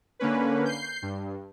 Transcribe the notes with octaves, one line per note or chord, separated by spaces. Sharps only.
D3 A#3 C#4 B4
G6 C7
G2